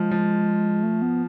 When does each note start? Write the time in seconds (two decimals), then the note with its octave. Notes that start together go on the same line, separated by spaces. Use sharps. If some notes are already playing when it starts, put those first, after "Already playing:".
Already playing: F3 G#3
0.11 F3
0.83 A3
1.02 B3